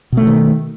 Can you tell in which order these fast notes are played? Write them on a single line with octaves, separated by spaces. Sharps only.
B2 A3 D3 D#3